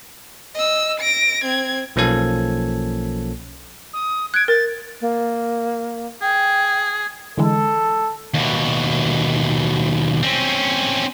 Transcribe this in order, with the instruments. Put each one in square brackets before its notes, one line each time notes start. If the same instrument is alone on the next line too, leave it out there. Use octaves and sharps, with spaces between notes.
[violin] D#5 E6
A#6 D7
C4 G#6
[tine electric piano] B1 F3 A#3 C#4 A4 G#6
[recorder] D#6
[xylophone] F#6 D7 [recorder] G#6
[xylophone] A#4 [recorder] A6
[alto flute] A#3
[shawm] G#4 [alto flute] G5
[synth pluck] D3 E3 G#3 [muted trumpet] A4
[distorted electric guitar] D#2 B2
C4 C#4